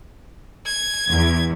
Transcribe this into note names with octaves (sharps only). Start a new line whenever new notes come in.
G#6
E2